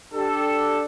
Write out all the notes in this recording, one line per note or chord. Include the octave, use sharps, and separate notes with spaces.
D4 G4 A4